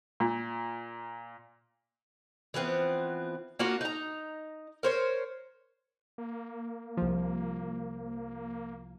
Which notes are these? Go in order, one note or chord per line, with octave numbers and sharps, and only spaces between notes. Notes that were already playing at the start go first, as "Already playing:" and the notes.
A#2
E3 F3 B3 C4
A#3 D4 F4 F#4
D#4 A#5
A#4 C5 C#5
A#3
C2 F3